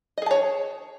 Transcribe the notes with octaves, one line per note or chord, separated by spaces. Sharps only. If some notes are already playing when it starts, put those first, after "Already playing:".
G#4 C#5 D#5 A5